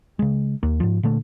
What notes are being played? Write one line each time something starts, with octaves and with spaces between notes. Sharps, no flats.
C#3 G#3
D#2 A#3
G#2 F3
A#2 D3 A3